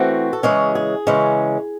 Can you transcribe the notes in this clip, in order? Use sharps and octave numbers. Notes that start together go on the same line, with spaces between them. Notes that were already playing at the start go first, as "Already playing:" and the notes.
Already playing: E3 A3 C4 F#4
A4
C#3 E3 G#3 C#4 G#4
G#4
C#3 E3 G#3 C#4